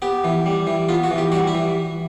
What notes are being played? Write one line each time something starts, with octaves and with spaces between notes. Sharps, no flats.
B3 G4
E3
G3
E3
B3 F4
F#4
E3
G4
G3 F#4
E4
E3